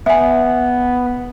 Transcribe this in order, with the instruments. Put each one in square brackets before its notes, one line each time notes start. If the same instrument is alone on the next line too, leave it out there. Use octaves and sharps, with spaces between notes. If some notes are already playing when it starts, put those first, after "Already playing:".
[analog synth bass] B3 [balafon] E5 G#5